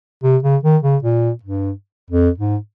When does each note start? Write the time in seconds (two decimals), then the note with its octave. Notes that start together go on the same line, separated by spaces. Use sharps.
0.23 C3
0.43 C#3
0.63 D#3
0.83 C#3
1.03 A#2
1.43 G2
2.11 F2
2.38 G#2